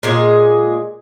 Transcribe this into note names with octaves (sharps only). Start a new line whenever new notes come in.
A#2 G#3 G#4